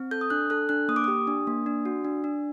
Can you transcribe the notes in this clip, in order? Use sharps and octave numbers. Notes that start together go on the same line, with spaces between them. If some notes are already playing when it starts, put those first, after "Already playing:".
Already playing: C4
A4 G6
D#6
D4 F#6
A4 F#6
D4 F#6
A#3 D#6
D6
G4 D#6
D4
A#3
D4
F#4
D4
D4